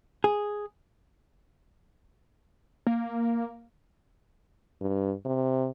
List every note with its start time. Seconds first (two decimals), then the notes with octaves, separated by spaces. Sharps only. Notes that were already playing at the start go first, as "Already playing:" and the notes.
0.24 G#4
2.87 A#3
4.81 G2
5.25 C3